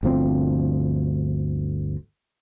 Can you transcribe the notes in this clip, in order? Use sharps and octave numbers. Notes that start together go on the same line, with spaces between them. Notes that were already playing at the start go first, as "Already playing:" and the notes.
G1 D2 F3 C4